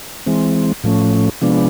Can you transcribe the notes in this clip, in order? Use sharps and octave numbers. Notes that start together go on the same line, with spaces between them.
E3 G#3 C4
A2 F3 A3 C#4
C3 F3 G#3 B3 D4